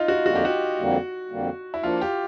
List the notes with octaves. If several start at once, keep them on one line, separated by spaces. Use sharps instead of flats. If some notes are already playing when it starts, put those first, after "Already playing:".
Already playing: D#4 F4
F#4
F2 D3 G3 A#3 F#4
G4
F#4
F2 D3 G3 A#3
F2 D3 G3 A#3
E4
F3 A#3 D4 F4
G4